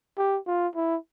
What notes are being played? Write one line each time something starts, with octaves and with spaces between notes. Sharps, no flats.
G4
F4
E4